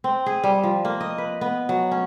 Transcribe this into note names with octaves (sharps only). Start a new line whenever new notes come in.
C4
G#4
G3
F3
A#3
D#5
B4
B3
F#3
C#4